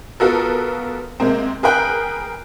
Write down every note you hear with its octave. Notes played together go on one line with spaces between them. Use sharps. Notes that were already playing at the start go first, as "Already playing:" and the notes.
B3 F4 F#4 A4 A#4
C3 G#3 A#3 C4
G#4 A#4 B4 G5 F#6